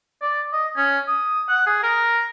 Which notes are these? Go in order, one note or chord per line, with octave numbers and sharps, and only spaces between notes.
D5
D#5
C#4
D#6
F#5
G#4
A#4